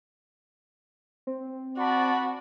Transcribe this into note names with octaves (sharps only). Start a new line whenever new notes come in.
C4
F#4 D5 A5 B5